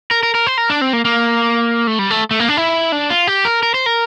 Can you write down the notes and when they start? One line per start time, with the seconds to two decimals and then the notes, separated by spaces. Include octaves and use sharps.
0.11 A#4
0.23 A#4
0.35 A#4
0.47 C5
0.58 A#4
0.70 D4
0.81 C4
0.93 A#3
1.05 A#3
1.87 A3
1.99 G3
2.10 A3
2.31 A3
2.40 A#3
2.49 D4
2.57 E4
2.92 D4
3.10 F4
3.27 G4
3.45 A#4
3.63 A#4
3.74 C5
3.86 A#4